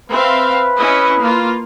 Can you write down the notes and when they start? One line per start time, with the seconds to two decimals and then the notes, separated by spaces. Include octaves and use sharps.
0.10 C4 B4 E5 F5
0.78 C#4 E4 D#5
1.19 A#3 F4